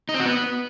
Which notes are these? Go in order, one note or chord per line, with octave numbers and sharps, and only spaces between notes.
D#4
C4
F#4
B3